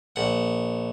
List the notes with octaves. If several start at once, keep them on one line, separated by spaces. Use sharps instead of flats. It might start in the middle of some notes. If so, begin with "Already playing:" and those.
A#1 F#5